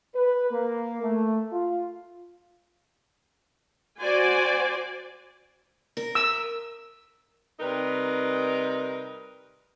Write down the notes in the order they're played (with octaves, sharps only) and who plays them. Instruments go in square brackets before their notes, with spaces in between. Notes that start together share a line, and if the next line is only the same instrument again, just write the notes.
[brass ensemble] B4
A#3
A3
F4
[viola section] F#4 C5 D5 G#5
[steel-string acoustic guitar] A#4
[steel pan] E6
[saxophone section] C3 G3 D#4 A#4 B4